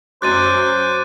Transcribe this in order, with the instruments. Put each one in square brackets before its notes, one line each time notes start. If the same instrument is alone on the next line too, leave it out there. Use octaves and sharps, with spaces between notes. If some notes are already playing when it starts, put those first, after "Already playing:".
[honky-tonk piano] F#2 F#3 [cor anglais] C5 [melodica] D6 [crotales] F#6 A6 D#7